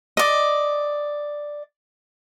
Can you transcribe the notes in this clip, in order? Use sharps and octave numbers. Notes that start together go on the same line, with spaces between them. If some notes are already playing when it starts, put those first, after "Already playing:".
D5 D#5